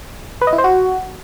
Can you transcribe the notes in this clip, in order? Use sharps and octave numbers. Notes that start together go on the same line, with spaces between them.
B4
D#5
E4
C5
F#4